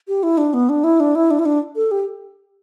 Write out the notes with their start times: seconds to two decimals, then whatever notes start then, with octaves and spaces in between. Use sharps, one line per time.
0.08 G4
0.23 E4
0.38 D4
0.54 B3
0.69 D4
0.84 E4
1.00 D4
1.15 E4
1.31 D4
1.39 E4
1.45 D4
1.76 A4
1.91 G4